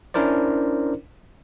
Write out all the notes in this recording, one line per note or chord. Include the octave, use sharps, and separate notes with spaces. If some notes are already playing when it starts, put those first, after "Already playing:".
C#4 D4 E4 A#4 C5 D5